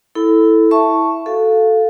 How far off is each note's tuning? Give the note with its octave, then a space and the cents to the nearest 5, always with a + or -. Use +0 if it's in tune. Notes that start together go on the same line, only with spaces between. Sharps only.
E4 -10 A4 +0 B5 +20
E5 +0 A5 +0 C#6 +0
F#4 +0 A4 +0 F5 +0